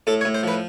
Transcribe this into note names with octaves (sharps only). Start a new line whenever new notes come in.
A2 A4
C#5
A2
C5
F3 B4